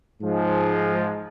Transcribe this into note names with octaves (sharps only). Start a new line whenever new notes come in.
G#2 F3 G#3